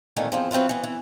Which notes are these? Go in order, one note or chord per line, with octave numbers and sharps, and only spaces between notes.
F2 A#2 D#3 E3 A3
E2 F3 C4
F#3 C4 E4 F4 B4
E3 B3
E3